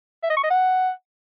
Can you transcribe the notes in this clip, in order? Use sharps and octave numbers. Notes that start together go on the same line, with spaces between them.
E5
D#5
C#6
D#5
F#5